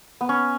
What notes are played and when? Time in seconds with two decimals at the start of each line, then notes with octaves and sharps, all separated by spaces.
0.21 B3
0.29 C#4